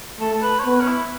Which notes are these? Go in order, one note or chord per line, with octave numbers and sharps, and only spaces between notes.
A3 A4
A4
B4
C#5
B3 B4
C#4
E4